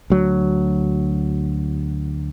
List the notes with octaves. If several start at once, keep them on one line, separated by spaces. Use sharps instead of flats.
D2 F#3